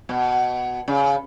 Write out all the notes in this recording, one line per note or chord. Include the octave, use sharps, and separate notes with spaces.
B2
C#3